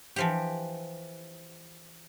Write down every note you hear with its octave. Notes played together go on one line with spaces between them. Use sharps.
E3 F3 G4